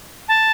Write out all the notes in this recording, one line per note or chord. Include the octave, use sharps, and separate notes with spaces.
A5